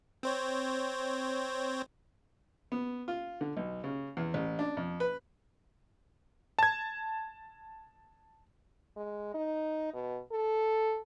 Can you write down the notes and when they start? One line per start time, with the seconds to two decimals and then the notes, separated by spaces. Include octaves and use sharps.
0.23 C4 C5 C#5
2.72 B3
3.08 F4
3.41 D3
3.57 B1
3.84 C#3
4.17 E2
4.34 A1
4.59 D4
4.77 F2
5.00 B4
6.59 A5 G#6
8.97 G#3
9.34 D#4
9.94 B2
10.32 A4